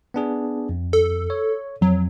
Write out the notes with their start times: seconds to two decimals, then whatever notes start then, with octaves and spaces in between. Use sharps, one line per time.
0.14 B3 D4 G#4
0.69 F2
0.93 A4
1.30 C#5
1.82 F2 F#3